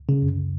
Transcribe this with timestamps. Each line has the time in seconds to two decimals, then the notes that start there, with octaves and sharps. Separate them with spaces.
0.09 C#3
0.22 F#2